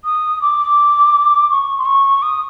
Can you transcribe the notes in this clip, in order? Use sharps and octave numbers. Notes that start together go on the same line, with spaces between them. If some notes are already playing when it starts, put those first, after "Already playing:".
D#6
D6
C#6
C6
C#6
D#6